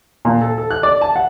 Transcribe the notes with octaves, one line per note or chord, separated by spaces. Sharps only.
A#2
A4
A4
F#6
D5
A5
F#5